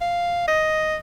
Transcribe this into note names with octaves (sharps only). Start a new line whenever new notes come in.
F5
D#5